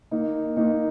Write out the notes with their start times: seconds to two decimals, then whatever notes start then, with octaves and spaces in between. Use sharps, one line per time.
0.11 A#3 D#4
0.57 A#3 D#4